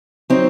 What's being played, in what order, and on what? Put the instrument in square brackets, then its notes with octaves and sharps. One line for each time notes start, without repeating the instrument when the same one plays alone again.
[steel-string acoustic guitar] F#3 C4 D#4